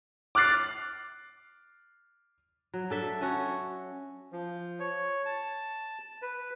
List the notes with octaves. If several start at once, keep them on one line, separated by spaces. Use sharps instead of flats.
D6 F6 F#6 A6 C7
F#3
D4 A4 E5
C#4 F#4 A4 C#5
F3
C#5
A5
B4